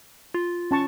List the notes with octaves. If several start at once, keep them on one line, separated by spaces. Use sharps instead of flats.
F4
C#4 A5 C#6